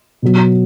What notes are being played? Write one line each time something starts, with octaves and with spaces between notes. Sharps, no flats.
B2 F#3